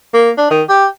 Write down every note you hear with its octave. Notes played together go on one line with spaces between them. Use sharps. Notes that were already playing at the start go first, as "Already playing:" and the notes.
A#3
D4
D#3
G4